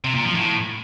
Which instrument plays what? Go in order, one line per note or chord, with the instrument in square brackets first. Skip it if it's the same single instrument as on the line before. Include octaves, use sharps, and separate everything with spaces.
[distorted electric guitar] C3
A#2
F3
A2